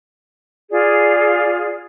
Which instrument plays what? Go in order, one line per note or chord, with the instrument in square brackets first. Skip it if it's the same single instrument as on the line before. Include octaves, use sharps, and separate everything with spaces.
[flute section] F4 G#4 D5